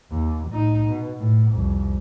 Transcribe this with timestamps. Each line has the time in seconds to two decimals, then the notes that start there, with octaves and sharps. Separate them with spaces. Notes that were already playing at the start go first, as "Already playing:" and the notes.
0.10 D#2
0.49 A2 D#4
0.87 B2
1.19 A2
1.52 C2 F2